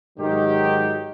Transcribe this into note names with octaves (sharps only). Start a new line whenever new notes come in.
G#2 D#3 F#3 D#4 G4